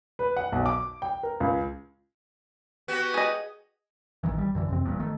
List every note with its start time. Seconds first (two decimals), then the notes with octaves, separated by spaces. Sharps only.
0.19 B4
0.37 F#5
0.52 B1
0.66 D6
1.02 G5
1.23 A#4
1.40 C#2
2.88 B3 F#4 G4
3.14 G#4 D#5
4.23 A1 G2 D#3 E3
4.38 G3
4.55 F#2 D3 E3
4.69 F2 C3 C4
4.85 F1 E2 G2 A#2
4.99 D#3 A3